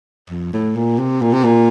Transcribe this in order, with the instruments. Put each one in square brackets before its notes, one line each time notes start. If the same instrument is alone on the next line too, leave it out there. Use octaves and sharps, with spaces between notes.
[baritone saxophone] F2
A2
A#2
C3
A#2
C3
A#2